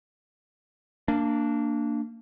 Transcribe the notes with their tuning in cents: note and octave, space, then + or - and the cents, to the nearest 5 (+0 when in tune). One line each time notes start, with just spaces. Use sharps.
A#3 -20 D4 +0